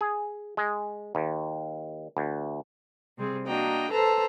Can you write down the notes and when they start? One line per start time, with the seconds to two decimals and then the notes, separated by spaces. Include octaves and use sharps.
0.01 G#4
0.57 G#3
1.15 D#2
2.17 D2
3.18 C3 G3 C4 G#4
3.47 A#3 D4 F#4 D#5 G5 A#5
3.90 A4 B4 C5 A5 A#5 E6